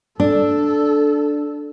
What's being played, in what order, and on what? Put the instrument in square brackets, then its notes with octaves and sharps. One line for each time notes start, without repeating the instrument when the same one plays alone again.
[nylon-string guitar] D4 [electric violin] A4